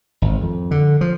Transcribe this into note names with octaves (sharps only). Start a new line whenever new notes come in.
G#1
F2
D3
F3